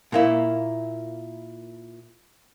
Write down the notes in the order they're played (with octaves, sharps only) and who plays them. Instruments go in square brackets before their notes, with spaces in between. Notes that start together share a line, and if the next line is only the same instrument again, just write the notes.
[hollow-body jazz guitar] A#2 A#3 E4